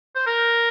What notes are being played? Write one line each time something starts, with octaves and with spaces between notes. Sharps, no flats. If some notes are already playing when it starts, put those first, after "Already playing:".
C5
A#4